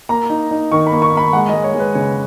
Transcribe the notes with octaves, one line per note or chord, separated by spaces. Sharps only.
A#3 A#5
D#4
D#4
D#3 C#6
B5
A#3
C#6
A#3 B5
G#3 F#5
D#5
G#3
C#5
G#3
B4
C#3 C#5